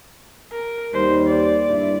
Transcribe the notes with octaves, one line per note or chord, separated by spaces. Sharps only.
A#4
D#2 G3 C5
D5
G2 E4